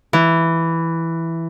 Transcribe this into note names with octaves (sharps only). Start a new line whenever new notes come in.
E3